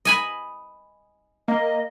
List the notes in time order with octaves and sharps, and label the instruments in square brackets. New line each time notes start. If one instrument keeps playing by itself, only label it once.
[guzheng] D#5 G#5 B5
[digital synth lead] A#3 [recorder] D#5